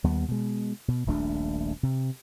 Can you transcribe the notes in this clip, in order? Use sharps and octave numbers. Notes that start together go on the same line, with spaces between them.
D#2 G3 B3
B2 G#3
B2
D#1 A#1 A3 D4
C3